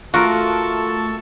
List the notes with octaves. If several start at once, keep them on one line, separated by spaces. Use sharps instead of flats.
A3 F4 F#4 A4 A#4 A5 C#6